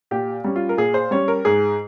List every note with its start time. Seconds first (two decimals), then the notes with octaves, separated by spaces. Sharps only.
0.11 A#2 G4
0.44 G3 C#4
0.56 F4
0.69 A#4
0.77 A#2 G#4
0.94 C5
1.11 G3 C#4 C#5
1.28 A#4
1.45 G#2 G#4